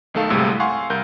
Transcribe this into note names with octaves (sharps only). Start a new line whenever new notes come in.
B1 D#3 A3 A4 F5
G1 C2 A2 C3 G#3 E6
F5 F#5 G#5 C6 C#6
C2 A#4 G6